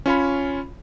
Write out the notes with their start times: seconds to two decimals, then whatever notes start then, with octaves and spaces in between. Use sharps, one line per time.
0.06 C#4 F4 C#5 B5